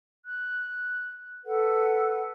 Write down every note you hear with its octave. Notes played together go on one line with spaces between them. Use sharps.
F#6
A4 B4 F#5